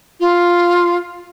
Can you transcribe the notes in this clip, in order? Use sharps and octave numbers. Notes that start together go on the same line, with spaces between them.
F4